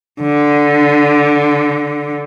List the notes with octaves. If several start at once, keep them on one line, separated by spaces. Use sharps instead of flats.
D3